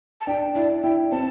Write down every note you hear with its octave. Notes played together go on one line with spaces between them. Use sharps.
A5
D4 G5
E4 D5
E4 G5
C4 A5